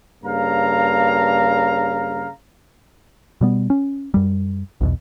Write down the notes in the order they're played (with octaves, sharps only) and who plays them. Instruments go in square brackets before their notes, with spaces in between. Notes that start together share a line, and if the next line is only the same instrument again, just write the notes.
[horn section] G2 C#3 A#3 F5 A#5
[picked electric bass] B2 G3 B3
C#4
F#2 G3
B1 E2 B2